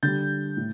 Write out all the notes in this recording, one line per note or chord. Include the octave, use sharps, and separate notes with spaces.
D3 G3 G6 A6
A2